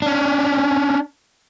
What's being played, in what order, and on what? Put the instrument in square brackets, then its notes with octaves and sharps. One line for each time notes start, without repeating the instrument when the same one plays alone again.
[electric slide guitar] C#4 D4